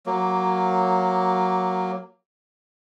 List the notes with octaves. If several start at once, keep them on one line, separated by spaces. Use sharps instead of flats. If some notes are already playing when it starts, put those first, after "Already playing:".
F#3 A#3